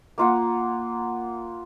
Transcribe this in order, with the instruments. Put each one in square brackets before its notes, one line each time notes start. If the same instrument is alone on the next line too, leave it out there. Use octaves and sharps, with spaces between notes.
[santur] A#3 F4 F#5